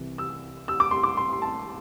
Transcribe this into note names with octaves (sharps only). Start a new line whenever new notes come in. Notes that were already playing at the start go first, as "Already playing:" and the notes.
Already playing: C2 C3 E3
E6
E6
D6
C6
D6
C6
C6
A5